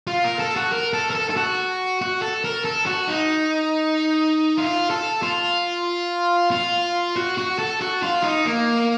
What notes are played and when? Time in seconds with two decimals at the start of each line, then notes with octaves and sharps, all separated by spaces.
0.07 F4
0.24 A#4
0.39 A4
0.56 F#4
0.72 A#4
0.93 A4
1.10 A#4
1.15 A4
1.30 A4
1.37 F#4
2.01 F#4
2.22 A4
2.44 A#4
2.65 A4
2.86 F#4
3.08 D#4
4.58 F4
4.90 A4
5.22 F4
6.51 F4
7.16 F#4
7.38 F#4
7.59 A4
7.81 F#4
8.03 F4
8.23 D#4
8.45 A#3